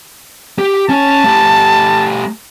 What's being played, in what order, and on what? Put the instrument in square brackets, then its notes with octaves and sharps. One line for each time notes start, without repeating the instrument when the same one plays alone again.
[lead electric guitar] G4
[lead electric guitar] C#4 C#5 [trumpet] A5
[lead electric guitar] A3 G4